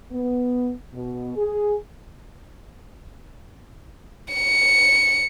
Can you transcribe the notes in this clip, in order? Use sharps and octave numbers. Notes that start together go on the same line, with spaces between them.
B3
B2
G#4
C#7